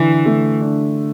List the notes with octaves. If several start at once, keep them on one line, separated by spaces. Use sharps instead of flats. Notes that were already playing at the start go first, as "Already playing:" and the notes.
Already playing: D3 E3
A3
D4